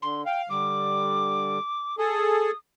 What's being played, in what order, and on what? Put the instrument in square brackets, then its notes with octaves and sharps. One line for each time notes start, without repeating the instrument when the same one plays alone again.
[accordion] D3 [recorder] C6
[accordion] F5 [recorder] G5
[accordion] D3 G3 [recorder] D6
[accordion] G#4 A4 [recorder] D#6